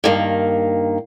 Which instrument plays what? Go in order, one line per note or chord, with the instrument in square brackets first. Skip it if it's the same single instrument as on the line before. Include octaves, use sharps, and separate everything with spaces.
[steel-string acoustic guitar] G2 D#3 A#3